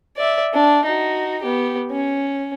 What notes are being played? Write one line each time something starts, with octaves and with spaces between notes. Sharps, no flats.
D5 E5
D4
D#4 F#4
B3 G4
C#4